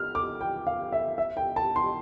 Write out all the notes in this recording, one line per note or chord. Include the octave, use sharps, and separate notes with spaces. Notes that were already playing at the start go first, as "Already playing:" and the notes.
Already playing: F6
D6
G5
F5
E5
E5
G5
A5
C6